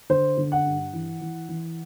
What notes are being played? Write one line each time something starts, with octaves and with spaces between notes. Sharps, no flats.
D3 C5
D3
F#5
G2
E3
E3
E3